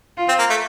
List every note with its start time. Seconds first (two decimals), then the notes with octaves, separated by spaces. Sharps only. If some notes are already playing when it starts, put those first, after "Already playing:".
0.17 F4
0.29 C4
0.39 A#3
0.50 A3